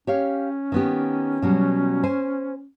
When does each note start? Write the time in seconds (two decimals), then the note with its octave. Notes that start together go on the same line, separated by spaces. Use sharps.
0.07 C#4 G4 C#5 F5
0.72 D#3 B3 G4
1.42 B2 F#3 G3
2.03 C5 G#5